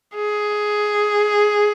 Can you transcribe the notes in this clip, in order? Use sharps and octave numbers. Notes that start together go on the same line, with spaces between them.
G#4